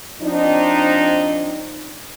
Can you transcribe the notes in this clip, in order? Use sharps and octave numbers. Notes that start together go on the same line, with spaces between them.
F3 C4 D4 D#4